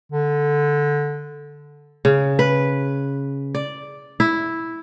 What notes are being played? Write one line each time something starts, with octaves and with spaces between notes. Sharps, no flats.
D3
C#3
B4
D5
E4